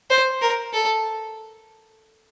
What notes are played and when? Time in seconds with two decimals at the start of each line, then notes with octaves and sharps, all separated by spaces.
0.10 C5
0.42 A#4
0.73 A4